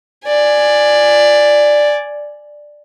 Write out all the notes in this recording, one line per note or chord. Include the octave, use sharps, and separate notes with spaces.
D5 G#5